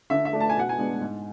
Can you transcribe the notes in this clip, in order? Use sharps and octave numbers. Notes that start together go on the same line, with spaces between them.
D3 E5
E5
A3 D4
A5
G#5
B2 F#5
G#5
G#3 B3 D4
G#2